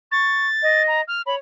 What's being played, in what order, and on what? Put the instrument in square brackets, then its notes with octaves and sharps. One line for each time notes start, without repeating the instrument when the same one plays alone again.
[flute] C#6 [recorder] A6
[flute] D#5
[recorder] A#5
F6
[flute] C#5 [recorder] B5